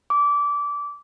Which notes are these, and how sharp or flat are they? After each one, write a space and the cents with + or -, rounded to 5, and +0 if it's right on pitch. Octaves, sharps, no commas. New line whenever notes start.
D6 -20